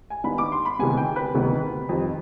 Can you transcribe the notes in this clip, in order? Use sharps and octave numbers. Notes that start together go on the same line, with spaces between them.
G#5
D#2 D#3 B3 D4 B5
D6
C6
B5
D2 C3 D#3 G3 B3 G#5
G5
B4
D2 C3 D#3 G3 B3
F2 D#3 G3